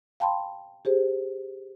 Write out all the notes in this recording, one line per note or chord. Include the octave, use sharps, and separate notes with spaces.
F5 G5 A5 B5 C6
G4 G#4 C5